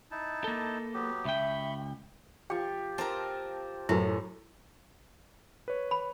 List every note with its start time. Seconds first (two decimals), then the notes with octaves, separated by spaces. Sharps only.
0.11 D#4 E4 A5
0.44 A#3 A4
0.94 F#3 B3 G4
1.25 C#2 E5 G5 B5 C#6
2.50 F3 G4 G5
2.98 C4 F4 A#4 A5
3.89 F#2 A2 E4 B4
5.68 B4 C#5
5.91 B5